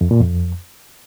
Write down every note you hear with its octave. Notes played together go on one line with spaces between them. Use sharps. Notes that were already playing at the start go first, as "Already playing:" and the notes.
F2
A#2
F2